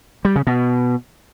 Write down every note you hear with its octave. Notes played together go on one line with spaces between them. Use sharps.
G3
C#3
B2